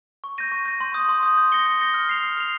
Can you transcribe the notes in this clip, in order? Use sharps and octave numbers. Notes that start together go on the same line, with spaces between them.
C#6
G6 A#6 D#7
C#6
G6 A#6 D#7
C6
D#6 G6
C6
D#6 G6
G6
A#6 C#7 G7
G6
A#6 C#7 G7
F6
C7 F7
F6
C7 F7